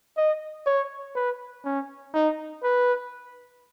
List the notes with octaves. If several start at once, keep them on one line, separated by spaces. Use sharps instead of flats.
D#5
C#5
B4
C#4
D#4
B4